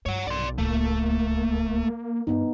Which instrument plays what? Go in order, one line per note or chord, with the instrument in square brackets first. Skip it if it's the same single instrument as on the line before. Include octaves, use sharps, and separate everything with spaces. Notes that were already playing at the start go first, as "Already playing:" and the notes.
[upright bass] G2 [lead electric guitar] C#5 F#5
[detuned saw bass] B1 [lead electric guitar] D5 C6
[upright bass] D1 C#2 [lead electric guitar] A3 [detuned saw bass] A#3
[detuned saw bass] G2 [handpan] B3 D#4